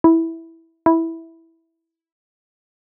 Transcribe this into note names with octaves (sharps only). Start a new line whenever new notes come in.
E4
E4